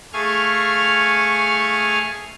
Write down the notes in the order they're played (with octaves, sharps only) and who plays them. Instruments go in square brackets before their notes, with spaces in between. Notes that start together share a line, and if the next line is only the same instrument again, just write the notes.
[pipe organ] A3 G#4 F5 G#5 C#6 F6